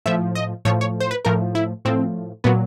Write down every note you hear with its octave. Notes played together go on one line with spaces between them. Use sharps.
A2 F3 E5
D#5
A2 F3 C#5
C#5
C5
B4
A2 F3 A#4
E4
A2 F3 C4
A#2 F#3 B3